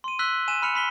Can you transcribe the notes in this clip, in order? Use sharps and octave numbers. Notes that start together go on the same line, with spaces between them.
C6 D#7
E6 F#6 B6 F#7 G7
G#5 D#7 E7
B5 F6 C#7 F7
B5 B6 G7